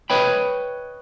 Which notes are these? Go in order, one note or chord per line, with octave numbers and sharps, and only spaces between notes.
B4 C#5 D#5 G5 B5